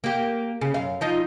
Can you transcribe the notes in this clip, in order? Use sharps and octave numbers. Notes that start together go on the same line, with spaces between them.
A#3 G4
C#3
F#2 F5
F3 D#4 F4